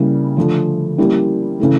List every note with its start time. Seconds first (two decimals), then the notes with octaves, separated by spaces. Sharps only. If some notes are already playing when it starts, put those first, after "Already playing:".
Already playing: C#3 G3 A#3 E4
0.36 D3 F3 A3
0.98 G3 A#3 C#4 E4 G4
1.60 C#3 E3 A3